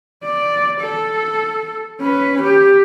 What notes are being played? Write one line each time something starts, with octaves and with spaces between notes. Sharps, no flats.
D5
A4
C#4 B4
G4